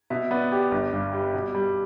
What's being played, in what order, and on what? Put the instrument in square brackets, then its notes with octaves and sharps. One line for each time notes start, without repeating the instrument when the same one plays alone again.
[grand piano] B2 [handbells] E5
[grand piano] B3 [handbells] D5
[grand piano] G4 [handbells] D5
[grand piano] G1
G2
G3
B2
G3